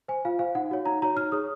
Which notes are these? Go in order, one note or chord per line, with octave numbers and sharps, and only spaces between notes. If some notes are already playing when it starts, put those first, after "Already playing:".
C5 G#5
F4 F5
C5 F5
D#4 F#5
F#4 C#5
D#4 A#5
F#4 C#5 A#5
D#4 F6
G#4 C#5 D#6